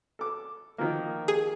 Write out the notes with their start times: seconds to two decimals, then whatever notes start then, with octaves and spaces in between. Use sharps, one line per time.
0.19 A4 D6
0.78 D#3 F3 A#3
1.28 G#4